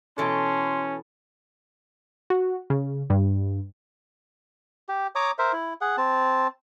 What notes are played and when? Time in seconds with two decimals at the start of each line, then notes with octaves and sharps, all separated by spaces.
0.18 B2 E3 C#4 A4 C6
2.30 F#4
2.70 C#3
3.10 G2
4.89 G4
5.15 C#5 A#5 D6 D#6
5.39 A#4 C5 E5
5.53 E4
5.81 G#4 F#5
5.98 C4 A5